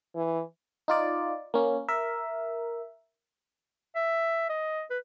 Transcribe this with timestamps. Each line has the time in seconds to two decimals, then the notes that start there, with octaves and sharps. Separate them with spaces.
0.15 E3
0.88 D#4 F4 D5
1.54 A#3 C#4
1.88 A#4 E5
3.96 E5
4.49 D#5
4.90 B4